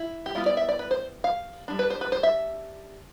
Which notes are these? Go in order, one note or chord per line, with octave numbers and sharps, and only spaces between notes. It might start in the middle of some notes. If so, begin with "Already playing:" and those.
Already playing: E4
G4
G3 B3 E4 F4
D5
E5
D5
B4
C5
F5
G3 D4
B4
C5
B4
C5
E5